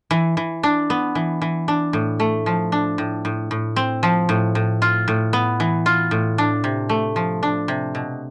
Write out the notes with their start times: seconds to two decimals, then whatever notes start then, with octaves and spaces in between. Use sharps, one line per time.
0.11 E3
0.37 E3
0.63 D4
0.90 B3
1.15 E3
1.42 E3
1.68 D4
1.93 A2
2.20 A3
2.46 F3
2.72 D4
2.98 A2
3.25 A2
3.51 A2
3.76 C4
4.03 F3
4.29 A2
4.55 A2
4.82 F4
5.08 A2
5.33 B3
5.60 E3
5.86 F4
6.11 A2
6.38 D4
6.64 C3
6.89 A3
7.16 F3
7.43 D4
7.68 C3
7.95 B2